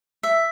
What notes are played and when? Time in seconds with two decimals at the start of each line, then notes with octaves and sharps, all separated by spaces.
0.23 E5